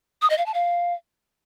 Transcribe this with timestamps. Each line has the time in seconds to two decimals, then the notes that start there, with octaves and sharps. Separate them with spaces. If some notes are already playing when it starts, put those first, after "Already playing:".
0.22 D#6
0.30 D#5
0.38 F5
0.46 A5
0.54 F5